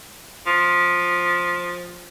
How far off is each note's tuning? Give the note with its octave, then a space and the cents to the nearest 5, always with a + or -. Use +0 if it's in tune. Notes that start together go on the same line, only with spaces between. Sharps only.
F3 +10